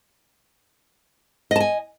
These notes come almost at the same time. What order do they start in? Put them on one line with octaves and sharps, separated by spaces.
D#5 A5 G#5